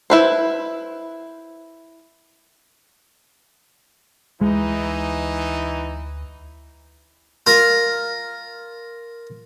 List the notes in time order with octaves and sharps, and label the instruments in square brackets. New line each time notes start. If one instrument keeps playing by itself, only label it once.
[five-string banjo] E4 B4 C5
[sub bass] D2 [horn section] E3 D#4 [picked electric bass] G#3
[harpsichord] F4 A#4